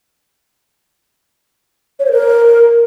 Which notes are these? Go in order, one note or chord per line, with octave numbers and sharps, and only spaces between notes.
C#5
C5
A#4